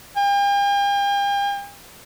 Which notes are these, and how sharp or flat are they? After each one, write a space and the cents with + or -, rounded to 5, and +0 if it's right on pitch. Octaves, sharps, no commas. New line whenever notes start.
G5 +45